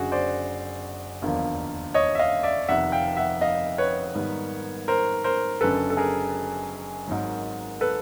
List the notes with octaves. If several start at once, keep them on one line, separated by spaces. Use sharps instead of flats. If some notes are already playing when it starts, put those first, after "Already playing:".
Already playing: F#1 F#2 D3 F#4 G#4
C5 D5
E1 D#2 D3 F3 A#3
C#5 D#5
E5
D#5 F5
D5 E5
F1 F2 C3 D#3 E5 F#5
F5 G5
E5 F#5
D#5 F5
B4 C#5
G#2 D#3 G3 B3
A#4 C5
A#4 C5
F#1 F#2 D3 A4 B4
A4
G#4 A#4
G#1 G#2 D#3 F#3
A4 B4